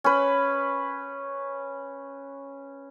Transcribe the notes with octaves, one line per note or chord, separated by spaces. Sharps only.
C#4 B4